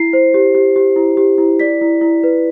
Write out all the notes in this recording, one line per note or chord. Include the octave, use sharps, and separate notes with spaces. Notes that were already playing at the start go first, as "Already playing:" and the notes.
Already playing: E4 C7
C5
G4
G4
G4
E4
G4
E4
D5 B6
E4
E4
B4